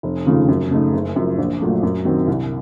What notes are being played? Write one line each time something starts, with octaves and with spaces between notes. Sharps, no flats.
F1
D#2 C#3 F3 A3
F#2
C#3 A3 D#4
F#1
F#2 F3
A#1
A#2 F#3 A3
F#2
D#3 F#3 C4
C2